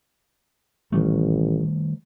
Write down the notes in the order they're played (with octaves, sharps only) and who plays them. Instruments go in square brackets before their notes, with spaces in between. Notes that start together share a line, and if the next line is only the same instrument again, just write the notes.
[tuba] A1 [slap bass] D#3 G3 A3